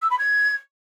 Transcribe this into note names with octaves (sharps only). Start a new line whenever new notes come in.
E6
B5
G#6